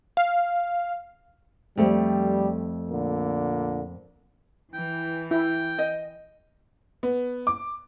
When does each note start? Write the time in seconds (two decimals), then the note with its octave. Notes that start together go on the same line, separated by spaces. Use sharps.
0.17 F5
1.77 F2 G3 A3
2.89 A#2 D3 A#3
4.74 E3 G5
5.31 E4 G5
5.78 D#5
7.03 B3
7.47 D6